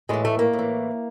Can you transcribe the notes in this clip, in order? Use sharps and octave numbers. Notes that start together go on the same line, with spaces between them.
A2 E3 G#3
A3
A#3
A2
E3